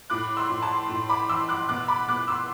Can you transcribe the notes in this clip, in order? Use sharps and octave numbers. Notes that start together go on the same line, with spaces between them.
A2 D6 F#6
C6 E6
A2
A5 C6
A2
B5 D6
E3 C6 E6
D6 F#6
B2 D6 F#6
B5 D6
B2 D6 F#6
C6 E6